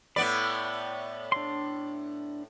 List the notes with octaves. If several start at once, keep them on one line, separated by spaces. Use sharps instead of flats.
A2 B3 D5 B5
D4 C6